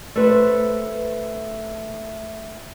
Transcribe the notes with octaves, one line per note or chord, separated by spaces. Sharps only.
A3 B4 C5